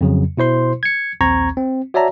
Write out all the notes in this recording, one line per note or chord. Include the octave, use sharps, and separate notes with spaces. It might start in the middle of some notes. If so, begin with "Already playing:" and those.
F2 C#3 F#3
B2 E4 C5 C6
G#6 C#7
A#1 D#2 C4 A#5 C#6 G#6
C4
F#4 C#5 D5 E5 A5 A#5